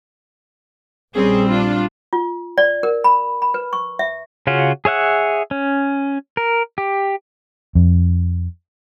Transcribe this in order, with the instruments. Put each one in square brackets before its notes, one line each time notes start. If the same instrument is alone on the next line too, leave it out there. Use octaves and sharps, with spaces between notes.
[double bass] A#1 G3 [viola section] C4 C#4 G#4
[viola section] D4 F4
[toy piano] F4
D5
A#4
B5
B5
B4
C#6
E5
[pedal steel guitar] C#3 C#4 F4 F#4
G#4 C#5 E5 F#5
C#4
A#4
G4
[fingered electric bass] F2